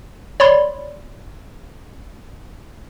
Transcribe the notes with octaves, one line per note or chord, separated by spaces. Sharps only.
C#5 D5 B5 C6